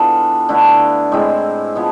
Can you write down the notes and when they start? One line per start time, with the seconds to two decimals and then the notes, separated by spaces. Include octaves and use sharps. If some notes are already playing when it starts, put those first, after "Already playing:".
Already playing: E3 B3 D4 F4 A4
0.49 D3 A3 E4 B4
1.12 A2 G#3 C4 E4
1.76 F3 B3 E4